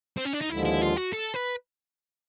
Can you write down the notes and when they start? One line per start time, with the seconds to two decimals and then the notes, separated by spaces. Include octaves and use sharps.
0.17 C4
0.25 C#4
0.34 D4
0.42 D#4
0.50 D#2 D3 F3 G#3 E4
0.65 E4
0.82 F4
0.96 F#4
1.13 A4
1.34 B4